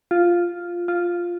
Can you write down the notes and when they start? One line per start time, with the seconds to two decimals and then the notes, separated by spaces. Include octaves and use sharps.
0.11 F4
0.88 F4